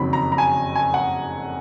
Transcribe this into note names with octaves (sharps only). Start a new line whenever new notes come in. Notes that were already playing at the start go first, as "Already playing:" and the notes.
Already playing: F#1 F2 D#3 F#3 B5
A#5
A#5
G#5
G#5
F#5